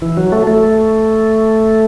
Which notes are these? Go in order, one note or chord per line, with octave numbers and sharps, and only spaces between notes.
E3
F#3
A3
A3